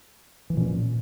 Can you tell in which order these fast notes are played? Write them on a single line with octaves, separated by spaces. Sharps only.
E3 F3 A#2 C#4